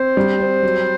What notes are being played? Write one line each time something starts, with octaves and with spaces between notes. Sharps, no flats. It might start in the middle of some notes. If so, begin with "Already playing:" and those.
Already playing: C4 C5
G3
C4
F#3